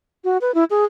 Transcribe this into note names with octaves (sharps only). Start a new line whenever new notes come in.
F#4
B4
E4
G#4